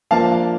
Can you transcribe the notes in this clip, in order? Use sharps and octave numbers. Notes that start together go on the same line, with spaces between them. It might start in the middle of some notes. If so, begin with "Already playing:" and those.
F3 A#3 D4 F5 A5